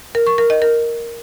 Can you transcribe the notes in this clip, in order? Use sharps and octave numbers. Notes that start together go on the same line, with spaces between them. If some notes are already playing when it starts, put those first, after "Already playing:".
A#4
C#6
A#4
D#5
A#4